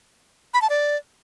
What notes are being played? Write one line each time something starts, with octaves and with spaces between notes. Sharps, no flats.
B5
A5
D5